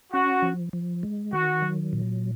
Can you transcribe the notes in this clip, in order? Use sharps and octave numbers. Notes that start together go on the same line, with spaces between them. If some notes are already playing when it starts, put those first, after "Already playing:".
C#4 F#4
F3
F3
G#3
D#3 F#4
F#3
A#2